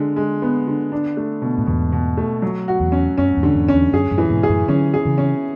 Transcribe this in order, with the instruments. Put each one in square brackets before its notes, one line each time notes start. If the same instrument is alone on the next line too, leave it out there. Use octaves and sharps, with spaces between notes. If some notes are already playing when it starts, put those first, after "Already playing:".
Already playing: [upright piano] D3 G#3
G#3
B3
D3
D4
A3
B2
[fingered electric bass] A2
[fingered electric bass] E2 G#2 [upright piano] B2
[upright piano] B2
A3
F#3
F#4
[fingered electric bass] E2
[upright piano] C#4
[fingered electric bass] F#2 [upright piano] C#4
[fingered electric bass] E2 G#2
[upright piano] D3
[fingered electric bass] E2 G#2
[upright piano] C#4
[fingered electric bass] E2
[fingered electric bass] F#2 [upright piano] G#4
[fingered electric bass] F#2 A2
[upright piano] E3
[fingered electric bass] G#2 B2
[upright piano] G#4
[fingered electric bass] F#2 A2
[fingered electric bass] D3 F#3 [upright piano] C#4
[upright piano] G#4
[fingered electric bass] C#3 E3
[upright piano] C#4